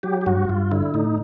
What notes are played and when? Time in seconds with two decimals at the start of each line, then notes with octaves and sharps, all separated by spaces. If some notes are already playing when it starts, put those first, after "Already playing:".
0.03 F#3 G4
0.21 G4
0.26 G2 F#4
0.49 G2 F4
0.72 D3 E4
0.94 A2 D#4